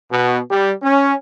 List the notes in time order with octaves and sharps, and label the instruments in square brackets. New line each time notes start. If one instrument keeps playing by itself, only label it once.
[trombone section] B2
G3
C#4